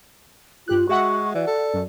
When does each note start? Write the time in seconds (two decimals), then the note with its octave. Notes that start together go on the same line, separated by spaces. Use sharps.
0.68 G2 F4 G4 F#6
0.89 G#3 F#4 E5 F#5 C#6
1.35 E3 D5
1.47 A4
1.74 F#2